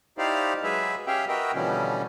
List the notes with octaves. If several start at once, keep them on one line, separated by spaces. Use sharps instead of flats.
D#4 E4 G4 C5 D5 F5
F#3 G#3 G#4 B4 E5
C#4 G4 G#4 E5 F5 G5
F#4 A#4 B4 D#5 E5 G5
B2 D3 E3 F3 G3 C#4